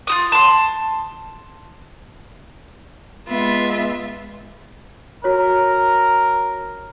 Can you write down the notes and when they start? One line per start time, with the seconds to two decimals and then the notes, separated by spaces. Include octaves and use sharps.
0.07 F4 F#4 D#6
0.32 A5 C6
3.28 G#3 B3 F4 E5
5.24 F#4 A#4 C#5